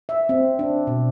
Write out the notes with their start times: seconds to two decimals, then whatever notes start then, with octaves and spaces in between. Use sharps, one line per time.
0.09 E5
0.29 C4
0.59 D4
0.87 B2